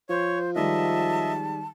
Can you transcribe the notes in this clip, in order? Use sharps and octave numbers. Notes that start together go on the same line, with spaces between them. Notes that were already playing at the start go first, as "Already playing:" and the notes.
F3 C5 C#5
D#3 G3 G#3 D#5 E5 A5